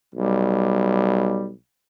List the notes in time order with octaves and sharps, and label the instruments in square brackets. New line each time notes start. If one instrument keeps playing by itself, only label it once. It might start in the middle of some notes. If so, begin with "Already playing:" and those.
[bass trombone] B1 [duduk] G3